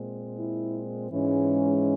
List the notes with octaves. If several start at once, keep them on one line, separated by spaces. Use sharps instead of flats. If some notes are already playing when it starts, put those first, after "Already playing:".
Already playing: A#2 G#3 C4
E4
G#2 E3 G#3 C#4